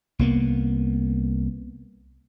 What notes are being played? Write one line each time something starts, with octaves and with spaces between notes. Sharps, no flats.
C2 A#3 B3